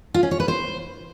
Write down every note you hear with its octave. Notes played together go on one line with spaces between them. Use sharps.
F4
C#4
C#5
B4
C5